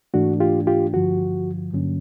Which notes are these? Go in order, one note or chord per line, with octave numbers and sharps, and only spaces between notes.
G#2 E3 A3 D4 F#4
F4 G4
F4 G4
G2 D3 F3 F#4
G2 D3 F#3 A#3 C#4